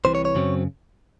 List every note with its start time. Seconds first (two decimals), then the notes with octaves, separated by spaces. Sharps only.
0.05 C2 C3 E3 C5
0.15 C#5
0.25 C#5
0.35 F#2 C#3 F#3 C4